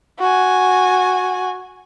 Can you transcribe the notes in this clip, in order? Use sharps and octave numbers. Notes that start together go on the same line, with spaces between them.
F#4 G#5